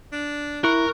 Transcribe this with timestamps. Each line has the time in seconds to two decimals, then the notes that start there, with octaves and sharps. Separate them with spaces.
0.12 D4
0.64 E4 A#4 C#6 F#6